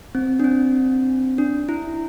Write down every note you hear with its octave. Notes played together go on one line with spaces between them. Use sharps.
C4
D4
C4
D4
E4